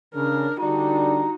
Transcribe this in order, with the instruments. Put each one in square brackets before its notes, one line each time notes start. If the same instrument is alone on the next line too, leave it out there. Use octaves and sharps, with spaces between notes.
[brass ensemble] C#3 [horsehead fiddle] D4 A#4
[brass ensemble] D3 G3 D4 [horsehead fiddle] D#4 F#4 [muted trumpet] A#5